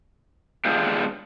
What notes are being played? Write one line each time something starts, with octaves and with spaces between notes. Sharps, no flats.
G#3 B3 D4 F4 G4